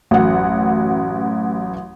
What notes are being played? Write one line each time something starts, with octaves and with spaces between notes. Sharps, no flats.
A1 F#2 F#5